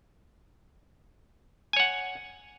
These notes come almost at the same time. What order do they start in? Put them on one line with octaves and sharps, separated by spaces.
G#5 C#5 F#5